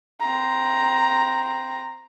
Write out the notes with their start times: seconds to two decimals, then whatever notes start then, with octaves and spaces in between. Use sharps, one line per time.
0.21 C4 A#5